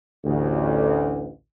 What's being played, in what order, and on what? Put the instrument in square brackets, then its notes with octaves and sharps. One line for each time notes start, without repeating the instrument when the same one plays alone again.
[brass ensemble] A1 D2